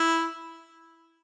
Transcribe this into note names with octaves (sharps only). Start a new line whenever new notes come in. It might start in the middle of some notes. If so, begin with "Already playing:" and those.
Already playing: E4